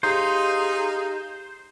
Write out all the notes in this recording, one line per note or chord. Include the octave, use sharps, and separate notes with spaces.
D#4 G4 G#4 C5 F5